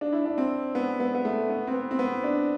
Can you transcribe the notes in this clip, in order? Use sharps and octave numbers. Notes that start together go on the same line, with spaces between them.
D4
E4
D4
C4
B3
B3
B3
A3
B3
C4
B3
C4
B3
D4